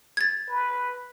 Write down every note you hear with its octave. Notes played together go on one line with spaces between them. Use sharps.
G#6 A6
B4